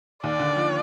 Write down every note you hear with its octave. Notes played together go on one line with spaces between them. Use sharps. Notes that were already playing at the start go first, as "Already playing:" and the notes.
D#2 D5
D3
F3